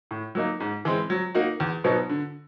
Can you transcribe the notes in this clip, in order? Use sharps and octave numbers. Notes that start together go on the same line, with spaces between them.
A2
F#3 A#3 D#4
G#2
E3 G#3 C4
F#3
A#3 D#4 F#4
E2
B2 F#3 B3 D#4
D3